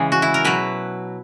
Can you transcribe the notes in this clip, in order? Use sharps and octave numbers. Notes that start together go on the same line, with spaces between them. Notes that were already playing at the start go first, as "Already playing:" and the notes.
Already playing: C#3 E3 G#3 G#4
F#4
E4
A#4
B2 F#3 B4